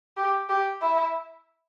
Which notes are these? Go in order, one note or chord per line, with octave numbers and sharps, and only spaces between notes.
G4
G4
E4